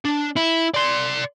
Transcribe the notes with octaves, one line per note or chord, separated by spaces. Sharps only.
D4
E4
D5 C6